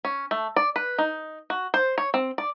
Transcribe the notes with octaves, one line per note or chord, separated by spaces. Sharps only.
C#4
A3
D5
B4
D#4
F#4
C5
C#5
C4
D5